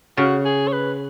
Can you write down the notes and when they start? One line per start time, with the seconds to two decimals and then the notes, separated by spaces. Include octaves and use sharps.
0.17 C#3 F#4
0.45 G#4
0.68 C#5
0.72 B4